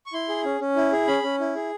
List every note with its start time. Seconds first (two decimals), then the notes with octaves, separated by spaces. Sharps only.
0.06 C#6
0.13 E4 C6
0.29 G#4
0.45 C#4
0.61 C#4
0.76 E4
0.92 G#4
1.07 C#4 B5
1.23 C#4
1.40 E4
1.55 G#4